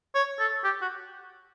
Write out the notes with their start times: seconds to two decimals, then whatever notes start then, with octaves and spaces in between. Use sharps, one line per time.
0.15 C#5
0.40 A4
0.64 G4
0.82 F#4